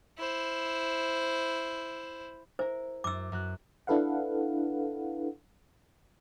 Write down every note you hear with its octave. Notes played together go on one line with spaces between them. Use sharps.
E4 C5
E4 A#4 C5
F#2 E4 D6 E6 A6
F#2 F#4 F#6
D4 E4 A4 B4 F5 F#5